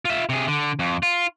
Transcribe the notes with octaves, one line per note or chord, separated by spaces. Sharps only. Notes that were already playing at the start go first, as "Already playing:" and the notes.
F4 E5
C3 G#4
D3
F2
F4